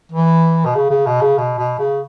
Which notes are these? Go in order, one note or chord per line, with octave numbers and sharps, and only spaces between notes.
E3
B2
C#3
C#3
B2
C#3
B2
B2
C#3